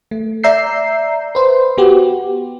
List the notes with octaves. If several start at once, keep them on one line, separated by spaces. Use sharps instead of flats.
A3
D5 E5 A#5 E6 G6 C7
B4 C5
B3 F#4 G4